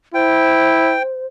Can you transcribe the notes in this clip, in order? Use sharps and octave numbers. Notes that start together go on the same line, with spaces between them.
E4 C5 G5